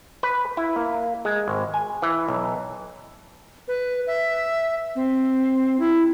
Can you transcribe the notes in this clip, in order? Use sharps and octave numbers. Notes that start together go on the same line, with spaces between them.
B4
E4
A#3
G#3
G#1
G#5
E3
B1
B4
E5
C4
E4